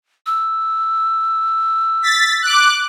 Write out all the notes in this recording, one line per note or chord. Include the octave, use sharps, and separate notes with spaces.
E6
A6 B6
D6 F#6